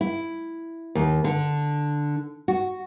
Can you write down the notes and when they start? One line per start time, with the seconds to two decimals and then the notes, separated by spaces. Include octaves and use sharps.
0.01 E4
0.95 D#2
1.24 D3
2.48 F#4